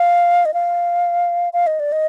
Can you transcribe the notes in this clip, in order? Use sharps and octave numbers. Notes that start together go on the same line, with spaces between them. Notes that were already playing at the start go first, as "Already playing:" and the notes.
Already playing: F5
D#5
F5
F5
D#5
D5
D#5